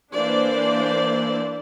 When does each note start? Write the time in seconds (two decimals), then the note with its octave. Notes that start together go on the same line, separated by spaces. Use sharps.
0.13 E3 A#3 D4 C5 D5